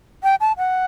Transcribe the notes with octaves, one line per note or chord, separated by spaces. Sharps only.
G5
A5
F#5